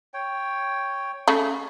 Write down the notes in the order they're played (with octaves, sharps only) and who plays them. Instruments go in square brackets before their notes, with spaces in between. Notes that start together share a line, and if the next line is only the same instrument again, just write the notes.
[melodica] C#5 G5
[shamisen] C#3 A3